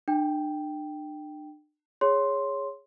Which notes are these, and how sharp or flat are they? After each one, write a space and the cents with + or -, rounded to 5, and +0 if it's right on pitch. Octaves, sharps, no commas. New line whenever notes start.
D4 +40 G5 +0
G#4 -10 C#5 +0 C6 +0